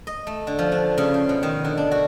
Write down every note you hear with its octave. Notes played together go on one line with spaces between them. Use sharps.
D#5
A3
D3
F3
D4
C#3
C5
B2
D#3
D3
D4
F#4